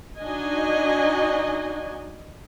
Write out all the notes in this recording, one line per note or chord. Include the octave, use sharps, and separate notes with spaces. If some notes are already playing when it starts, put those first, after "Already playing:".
D4 D#4 F#4 D#5 G#5